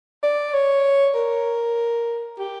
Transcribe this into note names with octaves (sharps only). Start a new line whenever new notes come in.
D5
C#5
A#4
G4